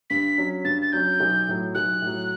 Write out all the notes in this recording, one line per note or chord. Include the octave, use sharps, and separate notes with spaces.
G2 B6
F#3 C#4
G2 A6
A6
F#3 C#4 G6
B1
A2 F#3
B1 F#6
A2
F#3